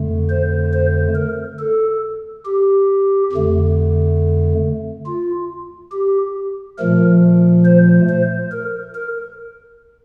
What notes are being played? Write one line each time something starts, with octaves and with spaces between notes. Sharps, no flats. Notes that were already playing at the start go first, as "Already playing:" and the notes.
Already playing: F2 D3 A3
C5
C5
A#4
A4
G4
F2 D3 A3
F4
G4
A#2 F3 A3 A#4
C5
C5
A#4
A#4